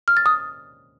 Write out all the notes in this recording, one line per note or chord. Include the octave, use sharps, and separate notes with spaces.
F6
A6
D#6